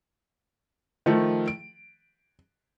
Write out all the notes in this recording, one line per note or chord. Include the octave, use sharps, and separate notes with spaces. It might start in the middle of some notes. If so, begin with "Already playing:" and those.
D#3 F3 A3
D7